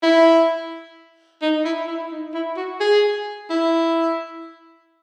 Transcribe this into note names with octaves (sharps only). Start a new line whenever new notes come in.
E4
D#4
E4
E4
D#4
E4
F#4
G#4
E4